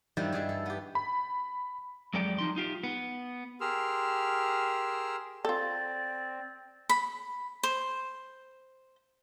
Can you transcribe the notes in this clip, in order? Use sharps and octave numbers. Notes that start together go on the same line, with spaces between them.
G2 D#3 F3 G3 E4
G2 G#4 E5
A4
B3 G4
B5
F2 F#3 G#3 A4 D5 G5
F3 D#4 C6
D#4 F4 G4
B3
G4 G#4 A#4 C6 E6 F6
C4 F4 A4 D5
B5
C5